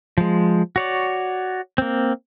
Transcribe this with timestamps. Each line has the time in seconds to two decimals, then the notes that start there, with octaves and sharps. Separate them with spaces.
0.18 F3 G#3
0.76 F#4 C#5 D5
1.78 A#3 C4